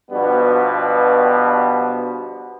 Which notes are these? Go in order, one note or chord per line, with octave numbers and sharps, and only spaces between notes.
G2 B2 F3 G3 B3